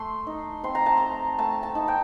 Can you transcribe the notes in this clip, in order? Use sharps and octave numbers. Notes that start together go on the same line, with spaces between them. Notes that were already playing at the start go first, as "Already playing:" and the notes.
Already playing: A3 C6
D#4
C4 C6
A#5
A5
A3 A#5
A3 A5
A5
D#4
G5